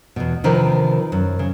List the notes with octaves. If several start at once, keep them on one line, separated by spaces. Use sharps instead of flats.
E2 B2
C3 D#3 F3 D4 A#4 B4
F#2
C#3